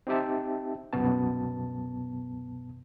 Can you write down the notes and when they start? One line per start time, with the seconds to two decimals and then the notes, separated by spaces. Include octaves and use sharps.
0.07 C4 D#4 G4 E5 A5
0.93 C2 F#2 B2 B3 A5